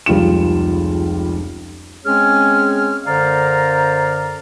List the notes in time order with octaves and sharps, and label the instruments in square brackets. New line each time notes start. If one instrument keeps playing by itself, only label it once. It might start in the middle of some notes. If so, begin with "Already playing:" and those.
[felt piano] F1 C#2 G3 F4 E7
[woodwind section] G#3 C4 C#4 G#4 C#5 F6
F#2 D3 C5 D5 F5 A#5